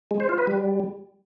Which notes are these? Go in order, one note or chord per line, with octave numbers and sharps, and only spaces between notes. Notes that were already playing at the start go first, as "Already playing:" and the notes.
G#3
C5
F4
B4
G3